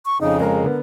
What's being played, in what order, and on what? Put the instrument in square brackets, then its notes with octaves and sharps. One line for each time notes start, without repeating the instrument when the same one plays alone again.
[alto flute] C#6
[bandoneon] F2 C#3 [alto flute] D#4
[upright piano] G#3 A#5 [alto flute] A#4
[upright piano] D3 B3